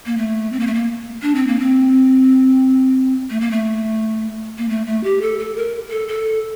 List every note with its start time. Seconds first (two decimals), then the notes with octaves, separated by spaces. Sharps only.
0.06 A#3
0.18 A3
0.52 C4
0.60 A#3
0.67 A3
0.74 A#3
1.22 D4
1.35 C4
1.47 A#3
1.60 C4
3.30 A3
3.41 A#3
3.51 A3
4.58 A#3
4.69 A3
4.86 A3
5.04 G4
5.22 A4
5.39 A4
5.56 A#4
5.91 A4
6.08 A4